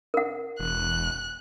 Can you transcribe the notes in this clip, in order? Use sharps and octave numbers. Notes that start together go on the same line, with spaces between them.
A#4 F#5
E1 F#6